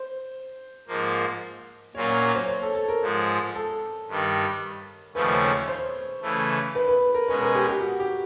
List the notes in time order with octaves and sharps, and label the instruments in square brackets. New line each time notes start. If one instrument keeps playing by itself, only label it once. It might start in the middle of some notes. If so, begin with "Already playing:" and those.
Already playing: [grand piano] C5
[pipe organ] G#2 F3 A#3
[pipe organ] A#2 F#3 A#3 C#4 F4 [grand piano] C#5
[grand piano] C#5
C#5
C5
C#5
A4
A4
A#4
[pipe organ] G#2 F3 G#3
[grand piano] A4
[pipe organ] G2 D#3 G3
[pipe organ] D#2 C#3 F3 A3 C#4 [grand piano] B4
[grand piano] C#5
C5
[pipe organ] C#3 E3 A3
[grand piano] B4
B4
A#4
[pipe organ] B2 G#3 C#4 [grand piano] B4
[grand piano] A#4
G4
G4
F#4
G4